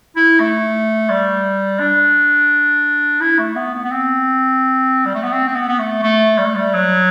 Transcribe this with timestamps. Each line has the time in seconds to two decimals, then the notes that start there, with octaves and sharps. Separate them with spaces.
0.16 E4
0.39 A3
1.09 G3
1.79 D4
3.20 E4
3.38 A3
3.55 B3
3.74 B3
3.84 B3
3.91 C4
5.05 G3
5.15 A3
5.23 B3
5.32 C4
5.47 C4
5.55 B3
5.68 B3
5.79 A3
6.03 A3
6.38 G3
6.46 A3
6.55 G3
6.73 F#3